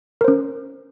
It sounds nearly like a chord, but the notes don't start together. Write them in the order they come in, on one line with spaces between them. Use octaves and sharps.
A#4 C5 C#4